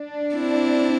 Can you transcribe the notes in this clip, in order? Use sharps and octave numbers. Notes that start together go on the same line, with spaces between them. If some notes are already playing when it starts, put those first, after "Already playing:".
Already playing: D4
C4 E4